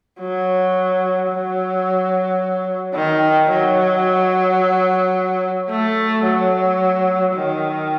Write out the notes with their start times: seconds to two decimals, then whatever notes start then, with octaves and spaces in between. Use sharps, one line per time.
0.20 F#3
1.29 F#3
2.94 D#3
3.50 F#3
5.69 A3
6.24 F#3
7.34 D#3